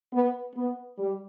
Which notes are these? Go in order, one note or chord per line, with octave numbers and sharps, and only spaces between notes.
B3
B3
G3